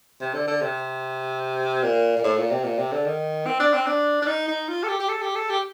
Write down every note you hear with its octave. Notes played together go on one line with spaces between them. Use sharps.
C3
D3
D3
C3
A#2
A#2
A2
A#2
C3
A#2
C3
D3
D#3
C4
D4
C4
D4
D4
D#4
D#4
F4
A4
G4
G4
A4
G4
A4
G4